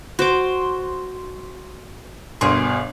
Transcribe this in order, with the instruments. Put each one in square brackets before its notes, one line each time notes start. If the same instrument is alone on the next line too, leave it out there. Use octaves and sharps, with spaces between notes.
[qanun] F#4 D6 [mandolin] C5
[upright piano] G1 B2 C6 [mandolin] A#3 G#4